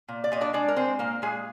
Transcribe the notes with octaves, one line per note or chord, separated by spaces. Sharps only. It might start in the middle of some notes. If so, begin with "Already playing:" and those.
A#2
D5
A#2 D#5
D4 D5
G#3 D4 D5
A#4
G#3 C4 C5
A#2 A#3 A#4
A#2 G#3 G#4